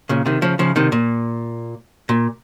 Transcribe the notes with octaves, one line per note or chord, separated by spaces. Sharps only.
A#2 C#3
C3 D#3
C#3 F3
C#3 F3
C3 D#3
A#2
A#2